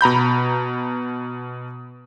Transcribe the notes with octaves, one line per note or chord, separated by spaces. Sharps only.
B2 A#5 B5 G6